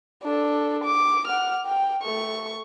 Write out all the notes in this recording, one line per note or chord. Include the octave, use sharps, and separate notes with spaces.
D4 A4
D6
F#5 F6
G5
A3 C#6